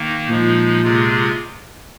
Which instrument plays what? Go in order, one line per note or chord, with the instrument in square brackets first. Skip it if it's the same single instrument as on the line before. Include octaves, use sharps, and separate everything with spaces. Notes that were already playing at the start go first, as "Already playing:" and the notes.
Already playing: [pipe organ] D#3 A#3 D#4
[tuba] A#2 [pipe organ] F3 G#3 D#4
[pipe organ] C3 G#3 F4 G#4